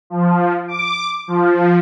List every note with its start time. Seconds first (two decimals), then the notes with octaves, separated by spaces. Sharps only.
0.10 F3
0.68 D6
1.28 F3